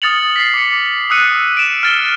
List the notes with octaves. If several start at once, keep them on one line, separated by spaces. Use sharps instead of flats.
D#6 F6 A6 C#7 F7 F#7
B6 C7
D6 C#7
D#6 E6 F#6 C#7 D#7
D7 E7
F6 A6 G7